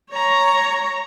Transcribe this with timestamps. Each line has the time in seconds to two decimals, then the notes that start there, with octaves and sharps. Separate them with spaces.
0.11 C#5 A#5